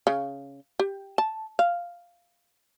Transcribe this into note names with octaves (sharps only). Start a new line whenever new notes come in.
C#3
G4
A5
F5